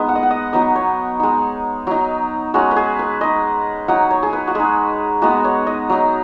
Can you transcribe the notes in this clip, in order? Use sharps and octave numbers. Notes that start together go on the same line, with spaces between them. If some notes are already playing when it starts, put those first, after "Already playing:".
Already playing: G#3 B3 D#4
F#5
D#5
F#5
D#5
F#3 B3 D#4 D#5
C#5
G#3 D#4
F#3 D#4
G#3 C#4 F#4
B4
G#4
B4
G#3 D#4 D#5
F#3 D#4 F#5
C#5
G#4
B4
F#4
G#3 D#4 G#4
G#3 B3 D#4 F#4
C#5
D#5
F#3 D#4